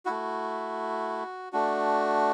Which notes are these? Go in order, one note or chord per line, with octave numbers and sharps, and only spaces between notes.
A3 E4 F#4
A3 D4 F#4